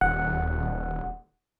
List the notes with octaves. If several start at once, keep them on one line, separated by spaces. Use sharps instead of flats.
D#1 F#5